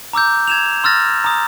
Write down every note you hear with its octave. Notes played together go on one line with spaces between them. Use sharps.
A#5 D6 E6 G6
G#6 E7 F7
C6 E6 F6 A6 A#6
A#5 D#6